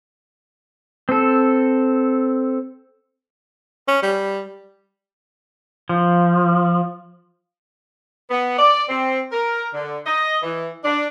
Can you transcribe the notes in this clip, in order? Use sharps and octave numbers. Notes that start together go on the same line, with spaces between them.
C4 A4
C#4
G3
F3
B3
D5
C4
A#4
D3
D#5
E3
D4